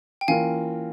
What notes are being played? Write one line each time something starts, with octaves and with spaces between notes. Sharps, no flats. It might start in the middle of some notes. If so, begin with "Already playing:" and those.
G5
E3 A#3 C#4 F4 A#4 F5 G#5